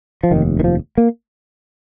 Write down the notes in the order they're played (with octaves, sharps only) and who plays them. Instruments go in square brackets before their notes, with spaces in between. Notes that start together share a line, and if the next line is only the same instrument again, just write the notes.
[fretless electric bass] F3
F1 D#2 D#3
D#3
F3
A#3